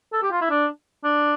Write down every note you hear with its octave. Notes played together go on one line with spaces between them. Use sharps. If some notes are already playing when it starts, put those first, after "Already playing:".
A4
G4
F4
E4
D4
D4